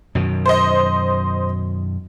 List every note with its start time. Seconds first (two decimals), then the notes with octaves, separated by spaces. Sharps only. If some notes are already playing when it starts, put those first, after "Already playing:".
0.15 F#2 B2 D#3
0.46 C5 D#5